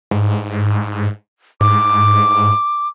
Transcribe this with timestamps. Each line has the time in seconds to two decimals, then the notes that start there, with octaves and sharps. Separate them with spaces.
0.11 G#2
1.61 G#2 D6